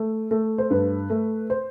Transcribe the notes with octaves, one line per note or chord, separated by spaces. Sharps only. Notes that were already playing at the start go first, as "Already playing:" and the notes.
Already playing: A3
A3
C5
G2 B4
A3
C5